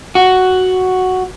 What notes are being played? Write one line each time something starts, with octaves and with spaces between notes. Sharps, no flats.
F#4